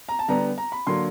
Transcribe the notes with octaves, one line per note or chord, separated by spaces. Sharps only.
A#5
A5
D3 G3 B3 A#5
A#5
B5
D3 F#3 A#3 C6